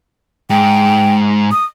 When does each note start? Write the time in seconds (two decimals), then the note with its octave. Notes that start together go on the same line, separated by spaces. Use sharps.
0.50 G#2 G5
1.51 D#6